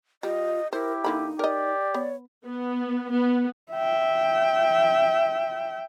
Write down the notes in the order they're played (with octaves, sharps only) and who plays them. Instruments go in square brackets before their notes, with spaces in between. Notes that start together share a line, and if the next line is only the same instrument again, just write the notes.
[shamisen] G3 [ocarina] F4 [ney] D#5
[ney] E4 [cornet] G4 [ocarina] A#4 [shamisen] C5
[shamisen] D3 A#3 B5 [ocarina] D#4
[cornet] G4 [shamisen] A#4 D#5 [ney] D5
[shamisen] B3 [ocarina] C#5
[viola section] B3
B3
[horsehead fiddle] E5 G5